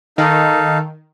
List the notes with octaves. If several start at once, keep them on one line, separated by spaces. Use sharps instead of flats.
D#3 D#4 A4 F5